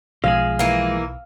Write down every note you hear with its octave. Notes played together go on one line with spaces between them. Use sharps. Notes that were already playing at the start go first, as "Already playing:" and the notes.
B1 F3 G#3 G#4 F5
E3 A#3